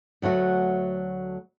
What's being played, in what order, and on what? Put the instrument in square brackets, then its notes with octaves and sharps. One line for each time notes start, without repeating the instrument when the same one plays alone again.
[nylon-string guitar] D2 F#3 A3 F#4